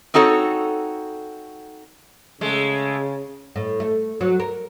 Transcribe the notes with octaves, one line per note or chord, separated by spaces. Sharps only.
C4 D#4 F#4 A4 C#5
C#3 G#3 A3
A2
A3
F#3
A#4